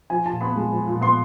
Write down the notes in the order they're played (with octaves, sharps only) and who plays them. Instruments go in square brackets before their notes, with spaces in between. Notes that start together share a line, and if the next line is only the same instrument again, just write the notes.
[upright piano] F3 G#5
A#2 A5
B3 B5
G#3
F3
A#2
B3 C6